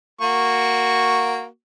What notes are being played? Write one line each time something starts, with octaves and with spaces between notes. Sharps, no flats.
A#3 F#4 C#6